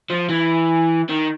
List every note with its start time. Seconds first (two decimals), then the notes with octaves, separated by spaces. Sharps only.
0.10 F3
0.29 E3
1.09 D#3